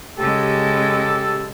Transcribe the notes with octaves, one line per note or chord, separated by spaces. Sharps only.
C#3 G#3 G4 A4